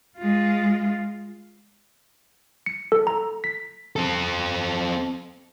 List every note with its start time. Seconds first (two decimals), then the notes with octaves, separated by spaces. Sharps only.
0.18 G#3 F4
2.66 C#7
2.92 A4
3.07 A#5
3.44 B6
3.96 C4 A4